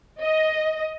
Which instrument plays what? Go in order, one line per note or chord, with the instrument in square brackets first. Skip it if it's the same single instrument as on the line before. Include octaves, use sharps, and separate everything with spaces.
[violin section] D#5